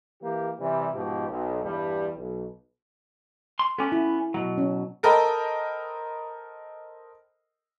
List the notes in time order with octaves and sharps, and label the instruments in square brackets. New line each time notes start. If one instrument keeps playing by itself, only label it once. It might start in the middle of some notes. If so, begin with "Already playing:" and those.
[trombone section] E3 A#3 G4
C3 E3 G3
G#2 B2 F3 G4
B1
E2 G2 G3
B1
[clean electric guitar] C6
[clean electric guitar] B3 C#4 [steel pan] A4 D6
[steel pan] E4
[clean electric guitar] B2 F#3
[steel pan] C#4
[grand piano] A4 A#4 C5 D#5 G5 B5